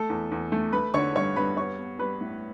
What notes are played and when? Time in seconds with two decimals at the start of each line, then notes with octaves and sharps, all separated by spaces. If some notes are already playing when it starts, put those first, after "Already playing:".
Already playing: A3 A4 A5
0.09 E2
0.31 E2
0.52 A3
0.73 A3 B4 B5
0.94 D3 C#5 C#6
1.15 G2 C#5 C#6
1.36 G2 B4 B5
1.57 B3 C#5 C#6
1.79 B3
1.99 G3 B4 B5
2.21 A2